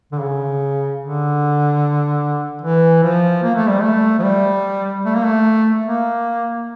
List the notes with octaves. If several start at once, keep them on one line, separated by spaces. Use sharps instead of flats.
D3
C#3
D3
E3
F3
A#3
A3
G3
A3
F3
G3
A3
A#3
A3
A#3